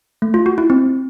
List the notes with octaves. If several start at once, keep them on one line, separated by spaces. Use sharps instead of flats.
A3
F4
F#4
E4
C4